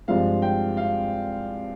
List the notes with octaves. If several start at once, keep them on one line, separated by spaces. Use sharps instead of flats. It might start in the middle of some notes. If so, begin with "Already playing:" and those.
G2 F3 G#3 C4 F5
G5
F5